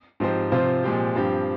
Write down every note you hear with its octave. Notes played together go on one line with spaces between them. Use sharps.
G#2 F3 C4 G4 C5
C3 F3 C4 F4 C5
A#2 F3 G#3 C4 G4
G2 F3 C4 G4